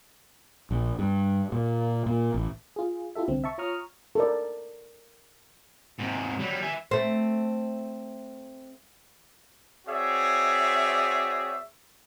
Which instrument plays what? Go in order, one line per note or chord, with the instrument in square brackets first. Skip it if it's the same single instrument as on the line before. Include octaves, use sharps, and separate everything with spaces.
[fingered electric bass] A#1
G2
A#2
A#2
A1
[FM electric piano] F4 G#4
E4 F4 G4 A4 E5
C2 D3 C4
E5 A5 C#6
F4 C#5 A#5 C#6 D#6 F6
[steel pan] A4 A#4 D5
[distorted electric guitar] G#2 C3
F#3 G3
E5 G#5
[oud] A3 C4
[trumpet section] C4 F#4 G#4 C#5 D5 E5